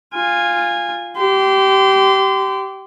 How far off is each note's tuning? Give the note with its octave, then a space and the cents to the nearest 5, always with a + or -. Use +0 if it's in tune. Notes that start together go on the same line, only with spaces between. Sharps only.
F4 +0 G#5 -15
G4 -20 C6 -30